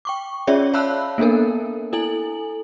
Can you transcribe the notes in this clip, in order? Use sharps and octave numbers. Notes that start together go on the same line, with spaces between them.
G5 C#6 D6
C#4 F4 G#4 C#5 D5 E5
C#5 F5 A5 B5 E6 F#6
A#3 B3 D4 A4 A#4
E4 A4 G#5 F#7